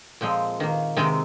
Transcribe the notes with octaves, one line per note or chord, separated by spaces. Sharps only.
A#2 F3 G#3 C4 G5
D#3 A#3
C3 D#3 G#3 C4 G5